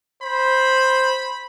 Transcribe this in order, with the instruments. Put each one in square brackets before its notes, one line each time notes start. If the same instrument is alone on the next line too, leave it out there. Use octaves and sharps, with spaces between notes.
[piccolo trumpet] C5 [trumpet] B5